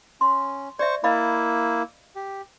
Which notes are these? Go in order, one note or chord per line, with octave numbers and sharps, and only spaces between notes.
C#4 C6
C5 D5 E5 C#6
A#3 E4 D#5 F5 B5
G4